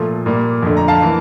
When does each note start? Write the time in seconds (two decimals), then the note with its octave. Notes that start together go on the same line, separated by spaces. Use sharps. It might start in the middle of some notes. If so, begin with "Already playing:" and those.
Already playing: A#2 F3 A3
0.26 A#2 G3 A#3
0.63 F2 D3 A3
0.77 A#5
0.88 F5 A5
1.03 E3 A#3